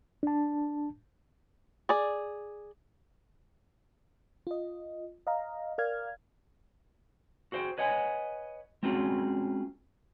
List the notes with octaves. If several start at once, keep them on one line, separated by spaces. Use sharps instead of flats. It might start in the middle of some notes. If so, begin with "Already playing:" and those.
D4 A5
G#4 D5
F4 D#5
D#5 F5 A#5
A#4 D5 F5 F6 G#6
F#4 G#4 C5 D#5 G5
B4 C#5 D#5 F#5 G#5
G#3 C4 C#4 F4 F#4 G#4